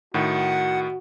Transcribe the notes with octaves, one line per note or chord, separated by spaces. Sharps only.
A2 D#3 F#4 F#5